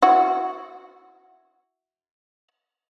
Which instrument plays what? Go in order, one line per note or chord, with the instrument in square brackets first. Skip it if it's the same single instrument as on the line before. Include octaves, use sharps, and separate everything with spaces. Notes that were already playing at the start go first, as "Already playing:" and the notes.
[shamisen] E4 F#4